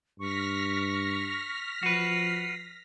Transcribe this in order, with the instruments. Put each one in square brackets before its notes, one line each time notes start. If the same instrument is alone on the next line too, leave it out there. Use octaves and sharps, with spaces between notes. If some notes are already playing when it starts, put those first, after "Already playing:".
[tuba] G2 [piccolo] C#6 [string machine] F6 A#6 B6
[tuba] F3 [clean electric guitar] F#4 B4 [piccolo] C7